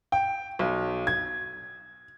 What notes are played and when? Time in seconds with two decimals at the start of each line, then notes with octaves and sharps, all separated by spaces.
0.12 G5
0.59 B1
1.07 G#6